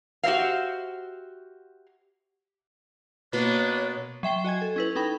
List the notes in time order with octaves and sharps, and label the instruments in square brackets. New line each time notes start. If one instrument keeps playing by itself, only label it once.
[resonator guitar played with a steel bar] F#4 G4 A#4 C5 E5 F5
[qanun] B2 A#3 C6 [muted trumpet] D4 [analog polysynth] B4 [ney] C#5
[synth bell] F#3 E5 G5 C7 G7
F#4 D#5 G#5 G#6
A4
C#4 E4 B4
C#4 D#4 A4 G5 B5